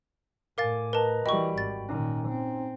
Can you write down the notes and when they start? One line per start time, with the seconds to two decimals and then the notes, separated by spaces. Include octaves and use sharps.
0.58 A2 A#4 F5 G#5 D6 A6
0.93 A#4 B4 D#5 A5 A#5
1.26 E3 G3 F#4 D#5 G5 B5 C#6
1.58 G#1 A6
1.89 A#2 D#3 C#4 D#4
2.28 C4